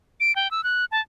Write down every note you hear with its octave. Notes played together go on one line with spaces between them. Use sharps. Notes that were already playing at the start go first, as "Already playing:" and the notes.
D7
G5
E6
F#6
A5